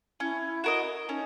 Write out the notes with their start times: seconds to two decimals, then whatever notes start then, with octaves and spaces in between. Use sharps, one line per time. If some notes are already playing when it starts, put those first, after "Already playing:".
0.20 C#4 E4
0.64 F#4 A#4 D#5
1.08 C#4 D#4